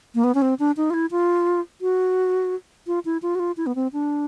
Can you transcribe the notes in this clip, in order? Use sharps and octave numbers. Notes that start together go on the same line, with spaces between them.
A#3
B3
C#4
C4
D4
D#4
F4
E4
F4
F#4
F4
E4
F4
F#4
F4
E4
B3
C4
D4